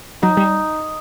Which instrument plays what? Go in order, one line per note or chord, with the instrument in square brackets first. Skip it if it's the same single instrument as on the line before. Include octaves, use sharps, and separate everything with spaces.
[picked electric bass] F#3 [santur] D#4
[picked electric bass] G3